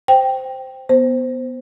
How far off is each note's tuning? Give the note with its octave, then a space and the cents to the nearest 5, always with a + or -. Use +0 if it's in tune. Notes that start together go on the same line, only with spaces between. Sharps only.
C5 +0 G5 +0
B3 +0 C5 +0